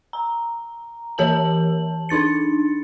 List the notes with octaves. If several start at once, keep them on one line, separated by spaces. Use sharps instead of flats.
A#5
E3 G4 A#4 A5 F#7
D4 D#4 A6 C#7